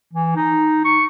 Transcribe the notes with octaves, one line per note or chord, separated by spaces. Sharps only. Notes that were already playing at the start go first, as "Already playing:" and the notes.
E3
D#4
C#6